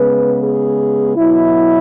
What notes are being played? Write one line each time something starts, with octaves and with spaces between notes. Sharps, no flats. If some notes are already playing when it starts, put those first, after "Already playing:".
Already playing: C#3 G#3 B3 B4
G#4
B2 F#3 B3 E4